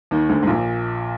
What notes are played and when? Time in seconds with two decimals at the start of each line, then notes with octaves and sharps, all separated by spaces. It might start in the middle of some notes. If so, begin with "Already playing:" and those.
0.11 D#2 D#3
0.29 D2 D3
0.42 G#2
0.47 A#1 A#2